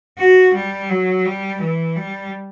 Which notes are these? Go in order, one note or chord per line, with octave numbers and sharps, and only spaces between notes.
F#4
G3
F#3
G3
E3
G3